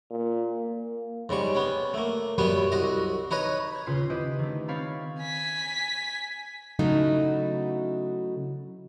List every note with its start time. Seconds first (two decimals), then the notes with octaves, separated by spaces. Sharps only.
0.11 A#2
0.62 A#3
1.29 G#2 C#3 G3 C#6
1.55 B3 C#4
1.94 A3 A#3
2.38 F#2 G3 B3 G4 C#5 G#5
2.72 C2 F#4 D#5
3.31 D#4 B4 C#5 D#5
3.72 B5 G#6
3.87 D#1 C#3 F4 B4 C6
4.10 E4 G4 B4 C5 D#5
4.39 D#3 A3
4.68 C4 C#5 F5 B5 A6
5.21 G#5 B6
6.79 C#3 F#3 A3 D#4 E4 F#4